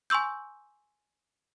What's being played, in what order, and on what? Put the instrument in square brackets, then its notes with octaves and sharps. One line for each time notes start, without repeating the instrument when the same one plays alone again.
[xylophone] G#5 C6 C#6 E6 G6